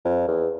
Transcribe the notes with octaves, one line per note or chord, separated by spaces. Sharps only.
F2
E2